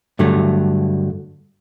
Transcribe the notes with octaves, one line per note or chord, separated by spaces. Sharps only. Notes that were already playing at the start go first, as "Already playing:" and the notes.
G2 D3 F#3 A3